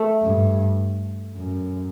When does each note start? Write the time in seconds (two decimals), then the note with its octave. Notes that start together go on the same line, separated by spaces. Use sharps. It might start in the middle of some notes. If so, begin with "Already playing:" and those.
Already playing: A3
0.23 G2
1.35 F#2